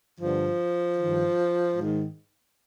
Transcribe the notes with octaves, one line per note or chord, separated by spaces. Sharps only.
G2 D3 F3
G2 D#3
G#2 D#3